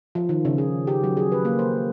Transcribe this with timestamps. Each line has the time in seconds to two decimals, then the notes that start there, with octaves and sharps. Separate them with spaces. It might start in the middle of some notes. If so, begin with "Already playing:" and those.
0.15 F3
0.29 D#3
0.45 C#3
0.58 G#4
0.87 G4
1.04 F#3
1.17 G#4
1.32 B4
1.45 A#3
1.59 C5